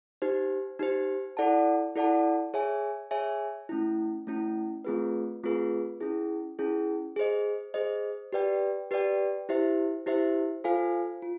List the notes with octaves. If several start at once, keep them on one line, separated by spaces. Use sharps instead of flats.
D#4 G4 C5
D#4 G4 C5
E4 A4 D5 F#5 A5
E4 A4 D5 F#5 A5
G#4 C#5 E5 G#5
G#4 C#5 E5 G#5
A3 C#4 E4
A3 C#4 E4
A3 C4 F4 G#4 B4
A3 C4 F4 G#4 B4
C#4 E4 G#4
C#4 E4 G#4
G#4 C5 D#5
G#4 C5 D#5
G4 B4 D5 G5
G4 B4 D5 G5
E4 G4 C5 E5
E4 G4 C5 E5
F4 A4 C5 F5 G#5
F4